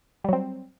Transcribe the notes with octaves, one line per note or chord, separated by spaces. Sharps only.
F#3 G3 C4